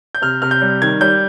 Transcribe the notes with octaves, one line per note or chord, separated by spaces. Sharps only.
G6
C3 F6
C3 F6
G6
G3
D#3 G#6
G3 G6